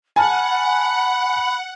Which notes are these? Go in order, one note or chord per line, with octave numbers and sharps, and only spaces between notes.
F#5 G#5 A5 B5 F6